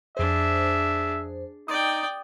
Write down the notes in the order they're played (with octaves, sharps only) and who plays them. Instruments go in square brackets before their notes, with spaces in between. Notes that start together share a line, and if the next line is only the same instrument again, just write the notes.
[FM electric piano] F2 C5 [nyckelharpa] D4 G#4 [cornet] E5
[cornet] D#4 [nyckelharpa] D5 G5 [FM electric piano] D#6